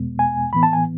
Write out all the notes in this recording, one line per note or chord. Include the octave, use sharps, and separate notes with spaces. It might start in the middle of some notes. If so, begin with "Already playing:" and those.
Already playing: E2 B2 G#3 B3
G#5
A2 E3 B3 B5
A5
G#5